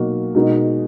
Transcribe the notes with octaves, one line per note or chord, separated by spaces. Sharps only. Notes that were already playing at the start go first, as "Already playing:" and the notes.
Already playing: B2 F#3 A#3 D#4 F#4
B2 G#3 D#4 F#4 A#4